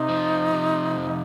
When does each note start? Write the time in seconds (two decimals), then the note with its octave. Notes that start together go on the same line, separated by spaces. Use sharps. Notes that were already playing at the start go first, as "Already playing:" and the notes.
Already playing: C3 D#4
0.09 F3
0.53 C3
0.97 F2